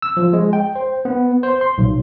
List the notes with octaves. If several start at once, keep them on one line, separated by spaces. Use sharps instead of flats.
E6
F3
G#3
G5
C5
B3
C5
C6
B1